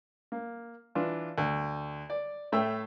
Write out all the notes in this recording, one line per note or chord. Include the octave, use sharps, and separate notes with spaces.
A#3
E3 D4 F4
D2
D5
A2 A3 G5 E6